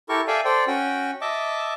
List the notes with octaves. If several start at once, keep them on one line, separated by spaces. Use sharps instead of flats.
E4 G4 A4 A#4 C#6
A4 D5 E5 F5 G5 G#5
A4 C5 D5 G5
C#4 F#4 G5
D#5 E5 A5 D6